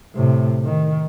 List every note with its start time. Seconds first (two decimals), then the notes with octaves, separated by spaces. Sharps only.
0.15 A2 C3
0.65 D#3